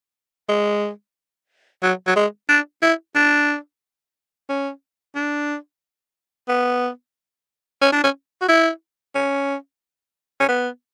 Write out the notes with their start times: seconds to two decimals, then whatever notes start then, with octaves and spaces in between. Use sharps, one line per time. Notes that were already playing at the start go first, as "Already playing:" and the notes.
0.49 G#3
1.83 F#3
2.07 F#3
2.16 G#3
2.49 D4
2.82 E4
3.15 D4
4.49 C#4
5.15 D4
6.49 B3
7.82 C#4
7.92 D4
8.04 C#4
8.42 F#4
8.48 E4
9.15 C#4
10.40 C#4
10.49 B3